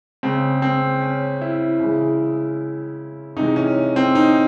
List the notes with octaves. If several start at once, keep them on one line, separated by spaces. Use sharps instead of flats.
C#3 G#3 C4
C4
C#4
E4
C#3 E3 G#3
C3 E3 G#3 D#4
C#4
C4
D#4